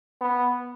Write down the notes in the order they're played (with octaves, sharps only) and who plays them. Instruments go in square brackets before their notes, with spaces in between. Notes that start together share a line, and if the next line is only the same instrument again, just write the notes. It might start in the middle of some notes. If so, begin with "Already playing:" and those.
[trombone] B3